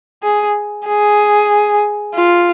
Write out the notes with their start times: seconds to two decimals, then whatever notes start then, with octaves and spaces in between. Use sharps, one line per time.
0.23 G#4
0.87 G#4
2.15 F4